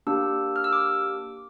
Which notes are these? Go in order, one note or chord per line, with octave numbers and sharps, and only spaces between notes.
A#3 D4 G4 E6
F6
E6
D6